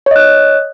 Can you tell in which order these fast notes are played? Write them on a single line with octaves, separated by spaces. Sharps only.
C#5 D#5 F#6